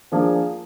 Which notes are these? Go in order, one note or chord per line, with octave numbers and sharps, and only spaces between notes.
F3 A#3 D4 G#4